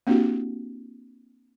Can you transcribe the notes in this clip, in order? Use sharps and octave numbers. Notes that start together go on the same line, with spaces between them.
A#3 C4 D4 E4 F#4 G4